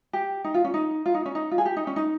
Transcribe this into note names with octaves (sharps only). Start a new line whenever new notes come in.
G4
D#4
F4
C#4
D#4
F4
D#4
C#4
D#4
F4
G#4
G4
D#4
C#4
D#4